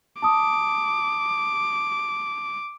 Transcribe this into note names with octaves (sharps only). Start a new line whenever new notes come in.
A5 D6 D#6